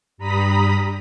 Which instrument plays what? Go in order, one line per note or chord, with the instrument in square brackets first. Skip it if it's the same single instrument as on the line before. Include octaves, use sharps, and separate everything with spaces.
[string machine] G2 G3 A#5 B5 D#6 B6